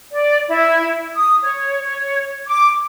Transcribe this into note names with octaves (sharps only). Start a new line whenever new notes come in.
D5
E4
D#6
C#5
C#5
D6